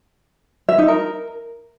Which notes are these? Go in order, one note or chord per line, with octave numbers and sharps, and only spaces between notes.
E5
D#4
A#4